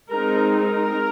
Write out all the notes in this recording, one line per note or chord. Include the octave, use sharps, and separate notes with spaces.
G#3 C4 D#4 A#4
A#4